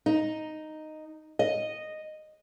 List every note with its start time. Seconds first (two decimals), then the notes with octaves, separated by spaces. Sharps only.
0.06 D#4
1.39 D#5